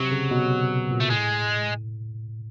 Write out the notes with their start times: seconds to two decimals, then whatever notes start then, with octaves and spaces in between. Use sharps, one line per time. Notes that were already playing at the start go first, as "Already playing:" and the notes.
Already playing: C3 F#3
0.11 C#3
0.31 B2
0.90 A#2
1.00 A3
1.10 A2 G#3